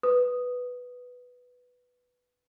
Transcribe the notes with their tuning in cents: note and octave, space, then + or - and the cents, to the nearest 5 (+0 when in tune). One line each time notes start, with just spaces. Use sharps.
B4 +0 D#6 +0